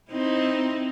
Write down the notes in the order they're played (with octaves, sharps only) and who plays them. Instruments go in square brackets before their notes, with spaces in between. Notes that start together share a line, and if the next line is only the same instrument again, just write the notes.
[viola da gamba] C4 D#4 E4